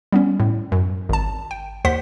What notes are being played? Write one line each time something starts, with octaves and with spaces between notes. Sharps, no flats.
G3 B3 C#4
A2
F#2
G#1 A5
G5
D#2 C5 F#5 C6 B6